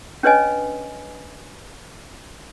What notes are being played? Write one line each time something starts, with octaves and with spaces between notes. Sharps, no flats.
C#4 D4 B4 C#5 D#5 G#5